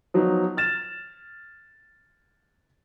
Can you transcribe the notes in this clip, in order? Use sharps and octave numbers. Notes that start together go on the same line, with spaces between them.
F3 F#3 B3 D#4
F6 A6 E7